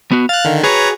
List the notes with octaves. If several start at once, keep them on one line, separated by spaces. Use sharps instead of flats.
B3 F#4
F5 F#6 A6
D3 D#3
F#4 G#4 B4 C#5 A#5